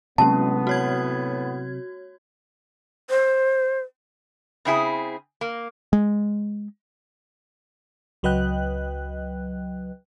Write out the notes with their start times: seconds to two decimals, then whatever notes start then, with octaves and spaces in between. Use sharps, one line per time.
0.18 A2 C3 F#3 G#3 A#3 B3 C#4 A5
0.67 F#4 C#5 G#6
3.10 C5
4.65 C#3 C4 E4 G#4
5.41 A#3
5.93 G#3
8.23 C#2 F#3 B4 D#5 G5 F#6